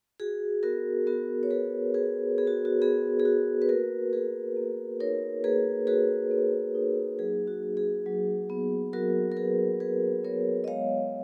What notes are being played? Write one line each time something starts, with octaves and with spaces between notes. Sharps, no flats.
F#4 G#4
B3 F#4 A#4
B3 F#4 A#4
C#5
F#4 G#4 B4
F#4 G#4 B4
B3 G#4
F#4
F#4
B3 G#4
G#4
F#4
B4
A#3 F#4 A#4
F#4 G#4 B4
A#3
D#4 A#4 C#5
A#3 G#4 B4
F#4 G#4 B4
A#3
D#4
F#3 G#4
F#4
F#4
G#4
F#3
B3
F#3 F#4 A#4
A#4
F#4 G#4 B4
F#3 G#4 B4
B3 A#4 C#5
D#5
G#3 C#5 F5